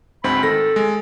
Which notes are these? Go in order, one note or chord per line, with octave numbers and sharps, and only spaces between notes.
D2 G#2 C4 B5
D#3 A4 A#6
G#3